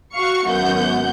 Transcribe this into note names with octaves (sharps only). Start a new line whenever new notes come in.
F#4 F5 C#6 C#7
G#1 F#2 B3 F#5 G6